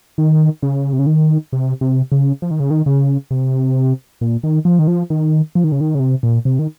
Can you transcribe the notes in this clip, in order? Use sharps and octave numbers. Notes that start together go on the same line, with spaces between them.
D#3
C#3
C3
C#3
D#3
C3
C3
C#3
F3
D#3
C#3
D#3
C#3
C3
A#2
D#3
F3
D#3
F3
D#3
F3
D#3
C#3
D#3
C#3
C3
A#2
C3
D#3